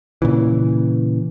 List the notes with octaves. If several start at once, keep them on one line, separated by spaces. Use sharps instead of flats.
A#2 C#3 E3